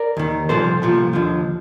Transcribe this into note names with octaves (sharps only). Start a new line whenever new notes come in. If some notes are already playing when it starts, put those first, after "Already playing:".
Already playing: A#4 D5
D#2 D#3
C2 A#2 F3 A4 C5
C2 A#2 F3
D#2 D3 F3